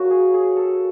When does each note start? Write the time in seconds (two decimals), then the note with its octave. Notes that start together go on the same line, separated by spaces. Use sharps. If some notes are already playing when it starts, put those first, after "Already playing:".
Already playing: F#3 A#3 C#4 F#4
0.10 G#4
0.34 G#4
0.57 A4